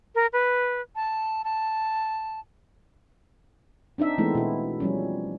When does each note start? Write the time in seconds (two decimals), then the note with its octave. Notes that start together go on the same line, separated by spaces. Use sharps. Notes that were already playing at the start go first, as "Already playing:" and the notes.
0.15 A#4
0.33 B4
0.96 A5
1.45 A5
3.98 C4 D4 D#4 E5
4.18 E3 G#3 A3 B3 C4 E4
4.35 B2 E4
4.80 F3 G3 C#4